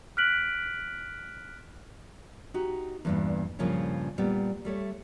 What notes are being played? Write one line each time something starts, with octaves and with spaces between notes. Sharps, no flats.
F6 F#6 B6 D7 F#7
D#4 F#4 G4
E2 G2 A#2
G2 A#2 C#3 F3 A#3 C#4
A#2 G3 B3
G3 A3 C#5